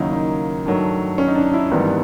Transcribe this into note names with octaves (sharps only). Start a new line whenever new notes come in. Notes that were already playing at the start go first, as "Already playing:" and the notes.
Already playing: D#2 C#3 F#3 A#3 D#4 E4
D#4
G2 D#3 F#3 A3
C#4
D#4
D4
E4
G#1 G#2 E3 G3 B3